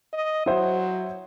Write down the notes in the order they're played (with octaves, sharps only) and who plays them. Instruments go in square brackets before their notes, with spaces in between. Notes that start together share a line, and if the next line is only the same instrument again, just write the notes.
[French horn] D#5
[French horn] F#3 [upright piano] E4 C5 F#5